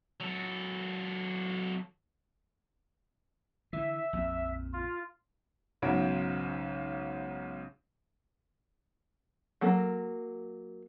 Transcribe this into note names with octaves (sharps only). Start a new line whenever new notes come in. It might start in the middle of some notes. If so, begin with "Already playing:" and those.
F#3 A4
D3 E3 E5
A#1 F2 A#2
F4
B1 G#2 C#3 F#4 G#6 D7
F#3 A#3 A4 A#4